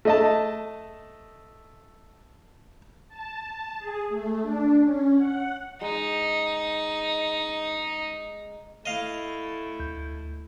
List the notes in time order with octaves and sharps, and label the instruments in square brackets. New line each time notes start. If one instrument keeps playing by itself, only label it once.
[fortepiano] A3 D#5 A5
[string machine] A5
A5
G#4
A3
D4
C#4
F#5
[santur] G#3 [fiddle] D#4
[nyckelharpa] A3 E4 [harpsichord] D#5 F5
[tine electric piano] D2 G6